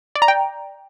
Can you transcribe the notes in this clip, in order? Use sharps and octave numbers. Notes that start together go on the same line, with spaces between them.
D5
A#5
G5